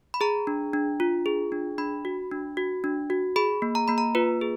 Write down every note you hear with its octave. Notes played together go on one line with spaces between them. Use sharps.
B5
G#4 A#5
D4
D4
F4
G#4
D4
D4 B5
F#4
D4
F#4
D4
F#4
G#4 B5
A#3
A#5
A#3 B5
A#5
F4 B4
G#4